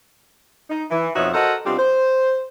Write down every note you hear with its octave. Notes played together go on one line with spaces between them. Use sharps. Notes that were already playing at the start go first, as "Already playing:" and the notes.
D#4
E3
F2 B2 D#4 F#4 C#5 E5
F#4 A4 A#4 C5 D#5 F#5
B2 G3 C4 D4 F4 G4
C5